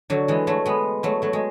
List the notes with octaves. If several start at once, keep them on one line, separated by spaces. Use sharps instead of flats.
D3 F#3
E3 G#3
F#3 A3
G#3 B3
F#3 A3
F#3 A3
G#3